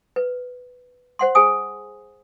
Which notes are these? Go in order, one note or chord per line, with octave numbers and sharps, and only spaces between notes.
B4
C5 F#5 C6
G#4 C5 G#5 D#6